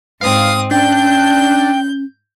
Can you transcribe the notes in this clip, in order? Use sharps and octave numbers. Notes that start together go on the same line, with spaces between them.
G#2 C4 F5 D#6
C#4 D4 G5 G6